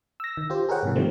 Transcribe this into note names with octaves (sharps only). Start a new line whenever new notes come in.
E6 A#6
D#3
F4 G4 C5
G#4 A#4 B4 C#5 F#5 G5
G#2 C3 E3
D#3 F3 G3 A3 C4